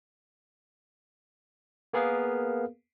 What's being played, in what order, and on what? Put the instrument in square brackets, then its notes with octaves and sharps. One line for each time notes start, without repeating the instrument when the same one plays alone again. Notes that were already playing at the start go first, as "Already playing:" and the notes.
[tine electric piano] A#3 B3 G#4 A#4 B4 F5